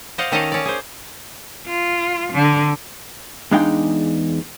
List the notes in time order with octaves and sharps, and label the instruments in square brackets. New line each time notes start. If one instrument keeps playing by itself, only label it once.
[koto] C5 D5 D#5 F5 F#5
D#3 C#4 A4 D#5 F5 A#5
C#4 D5
G#4 C5
[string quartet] F4
D3
[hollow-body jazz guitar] E2 G#3 D4 D#4 F5 G5